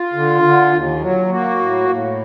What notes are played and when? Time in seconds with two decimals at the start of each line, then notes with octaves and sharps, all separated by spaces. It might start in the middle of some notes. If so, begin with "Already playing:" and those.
Already playing: F4
0.13 D3
0.42 D3
0.72 D#2
1.00 F#3
1.29 A#3 F#4
1.59 A2
1.89 A2